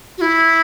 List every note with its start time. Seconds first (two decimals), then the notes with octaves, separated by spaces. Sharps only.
0.18 F#4
0.21 E4